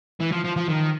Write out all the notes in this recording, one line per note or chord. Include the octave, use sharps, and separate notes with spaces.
E3
F3
F3
F3
D#3